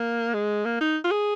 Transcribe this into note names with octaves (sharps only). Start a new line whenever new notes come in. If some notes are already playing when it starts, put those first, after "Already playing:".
Already playing: A#3
G#3
A#3
D#4
F4
G#4